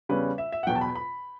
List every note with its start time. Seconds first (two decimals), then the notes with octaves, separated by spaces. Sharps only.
0.09 E2 C#3 G3 C#4 B4
0.38 E5
0.52 E5
0.63 F#5
0.67 E2 B2 F#3 G5
0.75 A5
0.81 B5
0.95 B5